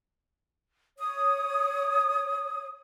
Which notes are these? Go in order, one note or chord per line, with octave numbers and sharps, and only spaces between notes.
C#5 D#6